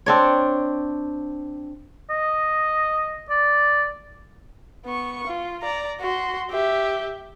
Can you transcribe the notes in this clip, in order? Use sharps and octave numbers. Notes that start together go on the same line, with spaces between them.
C4 D4 C#5
D#5
D5
B3 C#6
F4
D5 A#5
F#4 C6
G4 E5